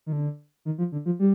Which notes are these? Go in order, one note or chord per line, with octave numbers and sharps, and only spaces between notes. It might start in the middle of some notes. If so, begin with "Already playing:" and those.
D#3
D3
D#3
F3
D3
F3
G3